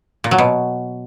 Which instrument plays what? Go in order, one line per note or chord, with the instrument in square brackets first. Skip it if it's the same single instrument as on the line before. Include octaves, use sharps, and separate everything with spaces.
[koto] A#2
F#3
B2